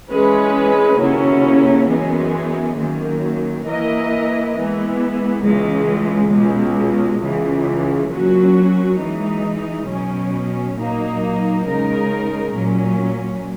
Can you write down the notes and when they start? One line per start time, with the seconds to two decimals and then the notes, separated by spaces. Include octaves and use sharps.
0.12 E3 G#3 C#4 G#4 B4
1.01 D#2 C#3 F#3 C#4 E4
1.89 F#2 E3 G#3 B3
2.79 F#2 D#3 A#3
3.67 E3 A#3 E4 A#4 D#5
4.56 E3 G#3 B3
5.45 C#2 C#3 E3 G#3
6.33 C#2 B2 G#3
7.22 C#2 C#3 E3
8.11 A#2 F#3 C#4 F#4
9.00 E3 G#3 D#4
9.88 B2 F#3 C#4
10.77 A#2 F#3 A#3 D#4
11.66 C#3 G#3 D#4 A#4
12.55 A#2 F#3 C#4